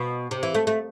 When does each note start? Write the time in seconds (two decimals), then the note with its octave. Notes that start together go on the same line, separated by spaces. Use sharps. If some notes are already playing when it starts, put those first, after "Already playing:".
Already playing: B2
0.31 C3
0.43 E3
0.55 A3
0.67 A3